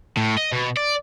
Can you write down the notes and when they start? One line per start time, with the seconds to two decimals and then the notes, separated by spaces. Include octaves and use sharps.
0.17 A2
0.37 D#5
0.53 B2
0.77 D5